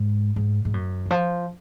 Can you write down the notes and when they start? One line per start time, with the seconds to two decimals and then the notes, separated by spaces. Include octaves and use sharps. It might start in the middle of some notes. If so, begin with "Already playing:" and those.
Already playing: G#2
0.36 G#2
0.65 G#2
0.74 F#2
1.06 D3
1.11 F3